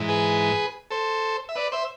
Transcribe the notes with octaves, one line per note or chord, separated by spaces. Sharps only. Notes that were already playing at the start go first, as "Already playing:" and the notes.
Already playing: G#2 E3
G#4 B4
A4 C5
E5
B4 D5
C5 E5